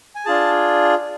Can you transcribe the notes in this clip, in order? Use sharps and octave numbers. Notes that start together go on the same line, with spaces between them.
G#5
D4 F4 G#4 A5